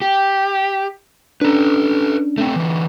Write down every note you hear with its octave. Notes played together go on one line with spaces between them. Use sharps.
G4
C#4 D4 A4 B4
A3 C4
D3 E3